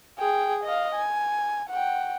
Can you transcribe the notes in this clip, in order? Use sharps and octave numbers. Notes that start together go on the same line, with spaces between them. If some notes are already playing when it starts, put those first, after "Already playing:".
G#4 G5
D#5 F5
G#5
F#5 G5